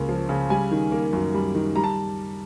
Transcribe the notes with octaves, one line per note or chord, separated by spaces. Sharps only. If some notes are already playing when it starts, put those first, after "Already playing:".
Already playing: C#2 C#3 A#3
F3
C#3
G3 G#5
D#3
A#3
F#2
G3
D#3
G3 A#5
A5